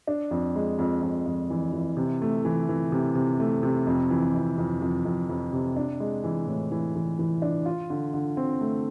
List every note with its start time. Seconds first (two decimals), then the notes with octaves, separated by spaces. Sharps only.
0.07 D4
0.31 F2
0.56 G#3
0.79 F2
1.02 F2
1.26 F2
1.50 E3
1.73 E3
1.97 C3
2.22 A3
2.45 E3
2.69 E3
2.92 C3
3.15 C3
3.40 A3
3.63 C3
3.87 F2
4.10 E3
4.34 F2
4.58 F2
4.82 F2
5.05 F2
5.29 F2
5.53 C3
5.77 D4
6.00 G#3
6.24 E3
6.47 A2
6.71 E3
6.95 E3
7.19 E3
7.42 D4
7.66 F4
7.90 D3
8.14 D3
8.37 C4
8.61 A3